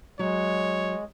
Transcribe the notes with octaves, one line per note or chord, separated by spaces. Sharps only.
F#3 G#3 C#5